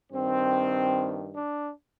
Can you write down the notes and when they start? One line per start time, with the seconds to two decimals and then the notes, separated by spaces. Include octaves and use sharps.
0.12 G2 D#3 C4
1.34 D4